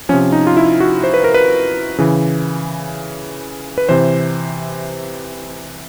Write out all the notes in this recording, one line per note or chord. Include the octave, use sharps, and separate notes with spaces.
C3 F3 C#4
D#4
F4
E4
F#4
C5
B4
A#4
B4
C#3 E3
B4
C3 E3 C5